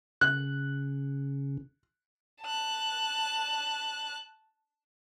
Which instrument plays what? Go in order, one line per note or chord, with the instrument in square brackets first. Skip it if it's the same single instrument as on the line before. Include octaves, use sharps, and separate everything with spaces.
[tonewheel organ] C#3 [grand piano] F#6
[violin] A5 F#6